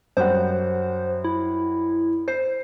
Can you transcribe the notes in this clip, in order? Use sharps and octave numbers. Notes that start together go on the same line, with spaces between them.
F#2 G3 C5 F#5
E4
C5 C7